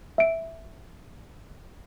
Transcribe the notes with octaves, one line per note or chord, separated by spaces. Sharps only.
E5 D7